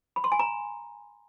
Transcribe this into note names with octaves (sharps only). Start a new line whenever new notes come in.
B5
C6
G#5
A#5